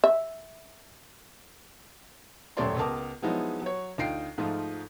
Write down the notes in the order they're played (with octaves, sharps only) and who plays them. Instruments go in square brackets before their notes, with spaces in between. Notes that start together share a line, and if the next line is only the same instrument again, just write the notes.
[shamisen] E5
[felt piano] D#1 F#2 A3 C#5 D5 C6
C#2 B3 A#4 A5 D6 D#6
F3 F#3 G#3 B3 D#4 E4
F#3 C#5
D2 D#4 F4 G5 C7 D7
G#2 F3 A3 D#4 F4